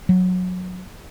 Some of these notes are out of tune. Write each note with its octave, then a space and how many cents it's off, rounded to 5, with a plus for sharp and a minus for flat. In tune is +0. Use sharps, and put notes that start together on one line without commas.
F#3 -20